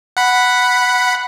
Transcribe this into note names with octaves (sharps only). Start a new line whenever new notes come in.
F#5 B5